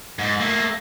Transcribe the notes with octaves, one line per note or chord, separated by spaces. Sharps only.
G#2
A3 A#3